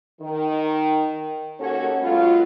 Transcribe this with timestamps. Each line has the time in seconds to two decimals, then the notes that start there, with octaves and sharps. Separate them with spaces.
0.21 D#3
1.59 D#2 A#3 C#4 F#4 A4 C#5
2.02 F#3 G#3 B3 F4